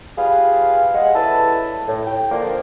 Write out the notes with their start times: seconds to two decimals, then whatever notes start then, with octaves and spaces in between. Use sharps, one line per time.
0.18 G3 F4 G#4 B4 F5
0.94 G#3 F#5
1.15 C#3 G3 E4 A4 B4 A5
1.88 A2
2.06 G5
2.31 D3 F3 A#3 D4